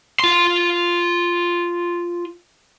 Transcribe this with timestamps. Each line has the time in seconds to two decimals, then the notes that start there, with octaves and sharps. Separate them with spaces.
0.19 F4 C6